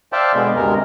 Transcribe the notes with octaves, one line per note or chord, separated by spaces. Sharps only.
C5 D5 E5 F5 G5 A5
B2 D3 G#3 B3
D2 G2 C3 G#3 A#4